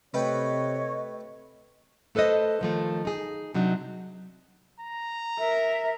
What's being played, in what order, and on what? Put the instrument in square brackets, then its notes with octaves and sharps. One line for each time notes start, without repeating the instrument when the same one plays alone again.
[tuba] C3 [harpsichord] A3 B4 G5 [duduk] C#5 [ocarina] D#5
[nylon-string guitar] A3 A4 B4 C5 D#5
D#3 F3 A3
D#4 G#4
C3 F#3 D4 D#4
[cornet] A#5
[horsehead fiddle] A#4 [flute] E5